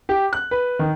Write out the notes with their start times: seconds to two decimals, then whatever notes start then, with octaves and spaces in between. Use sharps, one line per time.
0.09 G4
0.33 F#6
0.51 B4
0.79 D#3